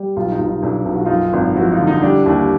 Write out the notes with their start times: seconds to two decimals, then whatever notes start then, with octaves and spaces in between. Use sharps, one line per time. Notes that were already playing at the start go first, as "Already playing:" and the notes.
Already playing: G3
0.16 B1 F4 G4
0.32 D#4
0.39 B1
0.47 D#4
0.62 B1 D4 E4
0.86 B1 F4
0.96 F#4
1.05 F#2 D#4 F4
1.33 G#1
1.56 F3 E4 F#4
1.72 D#4 F4
1.79 D3
1.87 D#4
2.02 G3 D4 E4
2.25 D#2 D4 E4